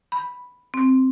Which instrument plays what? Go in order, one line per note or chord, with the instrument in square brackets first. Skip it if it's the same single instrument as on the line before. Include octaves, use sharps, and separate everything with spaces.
[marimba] B5
C4